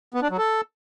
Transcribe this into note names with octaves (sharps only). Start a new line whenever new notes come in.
B3
D4
F#3
A4